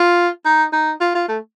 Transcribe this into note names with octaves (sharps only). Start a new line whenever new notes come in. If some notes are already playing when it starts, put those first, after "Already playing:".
Already playing: F4
D#4
D#4
F4
F4
A3